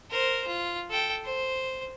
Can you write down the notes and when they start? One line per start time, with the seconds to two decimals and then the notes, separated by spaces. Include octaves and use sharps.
0.11 A#4 C5
0.47 F4
0.91 A4 G5
1.25 C5